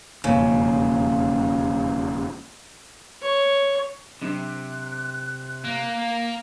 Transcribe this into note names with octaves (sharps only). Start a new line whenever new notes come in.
E1 F2 C#3 A#3
C#5
C3 F#3 D4 F#6
A#3